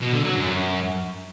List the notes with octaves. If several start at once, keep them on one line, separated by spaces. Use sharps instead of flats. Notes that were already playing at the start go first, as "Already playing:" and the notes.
B2
D3
F#3
F#2